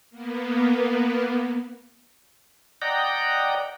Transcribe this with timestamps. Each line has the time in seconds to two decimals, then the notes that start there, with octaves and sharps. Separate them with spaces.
0.10 A#3 B3
2.82 D5 D#5 F#5 G5 A#5